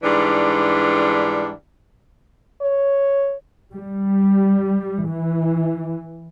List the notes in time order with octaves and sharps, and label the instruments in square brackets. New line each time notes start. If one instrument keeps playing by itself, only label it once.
[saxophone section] G#2 E3 G3 D4
[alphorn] C#5
[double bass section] G3
E3